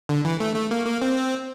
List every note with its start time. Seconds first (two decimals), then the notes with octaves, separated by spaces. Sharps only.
0.09 D3
0.25 E3
0.40 A3
0.55 A3
0.71 A#3
0.86 A#3
1.02 C4